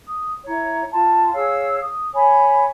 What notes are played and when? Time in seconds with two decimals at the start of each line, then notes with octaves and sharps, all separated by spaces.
0.06 D#6
0.45 E4 C#5 A#5
0.92 F4 A5 C6
1.34 G#4 C#5 F5 E6
1.79 D#6
2.14 C#5 G#5 B5